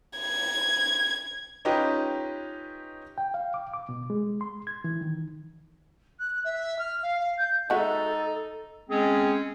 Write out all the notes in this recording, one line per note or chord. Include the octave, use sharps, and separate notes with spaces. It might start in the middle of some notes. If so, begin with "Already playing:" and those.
G#6
C#4 D#4 F4 G4 B4 D#5
G5
F5
D6
D6
B2
G#3
C6
G#6
E3
D#3
F#6
E5
F6
F5
F5
G6
G#3 D#4 F#4 A4 E5
G#3 C4 C#4 G#4